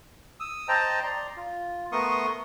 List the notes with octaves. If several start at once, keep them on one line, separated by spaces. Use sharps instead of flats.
D#6 E6
C5 D#5 G5 A5 A#5
D5 A#5 C6
F4
A3 B3 A#4 C6 C#6 D#6